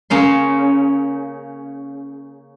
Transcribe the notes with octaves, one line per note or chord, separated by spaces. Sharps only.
C#3 A#3 C#4 C6